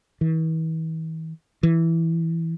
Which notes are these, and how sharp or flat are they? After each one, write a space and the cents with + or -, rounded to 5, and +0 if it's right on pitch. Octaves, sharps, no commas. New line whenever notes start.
E3 -45
E3 +0